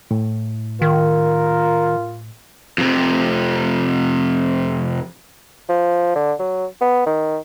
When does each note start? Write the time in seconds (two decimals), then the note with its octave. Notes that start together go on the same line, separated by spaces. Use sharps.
0.11 A2
0.82 D#3 F4 A#4
2.78 F2 C3
5.69 F3
6.16 D3
6.39 F#3
6.81 B3
7.07 D#3